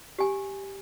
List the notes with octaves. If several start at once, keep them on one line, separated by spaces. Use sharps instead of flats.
G4 G#5